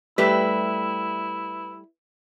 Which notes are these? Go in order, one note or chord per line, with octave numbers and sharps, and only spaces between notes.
G3 A3 E4 G4 B4 E5